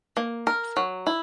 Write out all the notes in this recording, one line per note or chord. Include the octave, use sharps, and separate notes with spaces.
A#3
A#4
F#3
E4